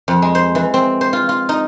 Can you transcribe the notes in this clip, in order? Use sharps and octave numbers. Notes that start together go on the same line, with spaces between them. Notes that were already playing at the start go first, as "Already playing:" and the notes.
F2
G#3
C5
E3
C4
C5
F4
F4
D#4